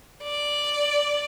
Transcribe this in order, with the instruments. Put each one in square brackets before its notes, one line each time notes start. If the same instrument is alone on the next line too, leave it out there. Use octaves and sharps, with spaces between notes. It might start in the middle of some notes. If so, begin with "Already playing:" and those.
[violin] D5